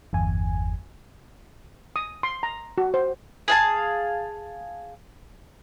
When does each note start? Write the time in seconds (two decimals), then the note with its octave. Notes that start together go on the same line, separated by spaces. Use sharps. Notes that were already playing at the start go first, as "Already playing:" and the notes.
0.13 G1 E2 G#5
1.96 D#6
2.23 C6
2.43 A#5
2.78 F#4
2.94 C5
3.48 G#4 F5 A5